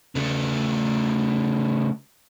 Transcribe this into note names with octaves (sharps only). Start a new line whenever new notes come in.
C#3 A3